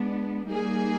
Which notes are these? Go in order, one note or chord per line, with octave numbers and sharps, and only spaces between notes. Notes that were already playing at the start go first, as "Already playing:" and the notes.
Already playing: G#3 B3 D4
G3 A#3 D#4 G#4